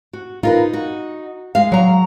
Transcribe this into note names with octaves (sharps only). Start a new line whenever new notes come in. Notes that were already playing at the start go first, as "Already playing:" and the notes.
F#4
D#4 F4 A#4 B4
F#4
G#3 F5
F#3 A#5